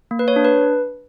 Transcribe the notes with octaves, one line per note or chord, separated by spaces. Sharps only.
A#3
B4
C#5
D4
B4